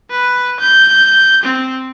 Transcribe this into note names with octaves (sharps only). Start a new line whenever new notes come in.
B4
G6
C4